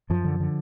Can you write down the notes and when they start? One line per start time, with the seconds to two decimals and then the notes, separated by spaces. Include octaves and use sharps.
0.10 F#2 F3
0.25 D3
0.40 D3